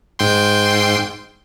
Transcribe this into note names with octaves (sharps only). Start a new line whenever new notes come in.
G#2 G5 C6